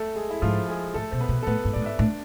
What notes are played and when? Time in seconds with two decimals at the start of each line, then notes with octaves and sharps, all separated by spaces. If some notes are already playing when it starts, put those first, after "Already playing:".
Already playing: A3 A4
0.16 G#3 G#4
0.30 E4
0.42 G#2 F3 F4
0.68 G#3 G#4
0.94 A2 A3 A4
1.11 B2 C5
1.21 B3 B4
1.29 B2
1.42 A4
1.47 A2 B3 B4
1.65 G#2
1.73 A2 D5
1.82 G#2
1.86 E5
1.99 A2 D4 D5